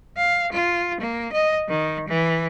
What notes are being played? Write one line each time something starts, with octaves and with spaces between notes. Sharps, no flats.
F5
F4
A#3
D#5
D#3
E3